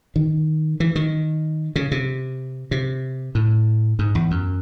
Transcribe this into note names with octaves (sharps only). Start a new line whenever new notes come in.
D#3
E3
D#3
C#3
C3
C3
A2
G#2
E2
F#2